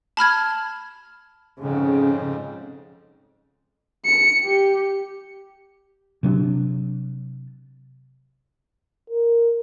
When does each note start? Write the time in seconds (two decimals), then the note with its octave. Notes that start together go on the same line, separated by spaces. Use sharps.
0.17 A5 B5 F6 G#6
1.60 F2 G#2 C#3
4.05 C#7
4.44 G4
6.23 C3 F#3 D4
9.10 A#4